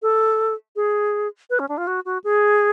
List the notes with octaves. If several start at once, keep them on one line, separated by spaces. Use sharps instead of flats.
A4
G#4
B4
C#4
D4
F4
F#4
F#4
G#4